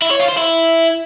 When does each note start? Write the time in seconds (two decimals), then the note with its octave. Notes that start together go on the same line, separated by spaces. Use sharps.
0.02 E4
0.11 C#5
0.19 F4
0.28 C5
0.37 E4